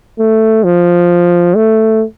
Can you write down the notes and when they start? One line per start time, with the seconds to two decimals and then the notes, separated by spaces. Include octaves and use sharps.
0.19 A3
0.64 F3
1.56 A3